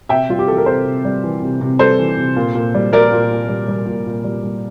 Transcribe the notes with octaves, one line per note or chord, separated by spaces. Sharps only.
C3 E5 G5
G3 F4
G4
E3 A4
A#4
C3 A4 C5
C3
G3
E3
C3
C3
G3 A4 C5
E3
C3
A#2
A#2
G3
G3 A#4 D5
A#2
A#2
G3
G3
A#2
A#2
G3
G3